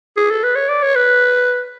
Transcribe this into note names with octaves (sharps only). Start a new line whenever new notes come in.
G#4
A4
B4
C#5
D5
C#5
B4